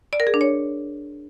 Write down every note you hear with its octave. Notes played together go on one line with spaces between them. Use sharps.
D5
A#4
G#4
D4
C#5